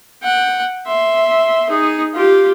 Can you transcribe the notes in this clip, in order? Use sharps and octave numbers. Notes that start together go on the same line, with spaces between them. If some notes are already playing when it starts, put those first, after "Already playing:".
F#5 G5
E5 C6
D#4 G#4
F4 G4